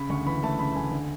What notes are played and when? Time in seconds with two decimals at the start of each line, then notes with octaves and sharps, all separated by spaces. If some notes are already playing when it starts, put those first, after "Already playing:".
Already playing: C#3 B5
0.10 D2 C#6
0.26 E3 B5
0.43 A3 A5
0.59 C#3 B5
0.75 D2 G#5
0.91 D3